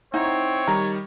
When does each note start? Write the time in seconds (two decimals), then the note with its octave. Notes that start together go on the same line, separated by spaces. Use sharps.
0.14 C4 D#4 E4 C#5 F#5
0.67 D#3 G3 A#5